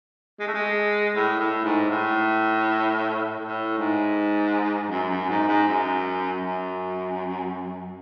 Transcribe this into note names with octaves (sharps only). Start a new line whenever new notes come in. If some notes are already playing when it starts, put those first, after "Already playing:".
G#3
A3
G#3
A2
A2
G#2
A2
A2
G#2
F#2
F#2
G#2
G#2
F#2
F#2